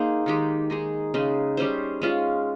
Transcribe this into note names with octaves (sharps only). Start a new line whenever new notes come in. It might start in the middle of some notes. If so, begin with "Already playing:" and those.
Already playing: A#3 D#4 G#4 C5
D#3 G#3 D#4 G4
G#3 D#4 G#4
C#3 G#3 D#4 G#4
G3 C#4 G#4 C5
G#3 C#4 F4